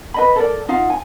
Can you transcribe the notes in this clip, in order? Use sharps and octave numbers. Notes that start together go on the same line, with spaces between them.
B4 D#5 B5
A4 A#4 D5
D#4 F4 F5 F#5
G#5